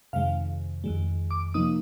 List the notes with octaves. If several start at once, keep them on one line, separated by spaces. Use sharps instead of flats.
F2 C3 D#3 G#3 F5
F2 D#3 G#3
D6
C3 F3 A#3 D#4 D#6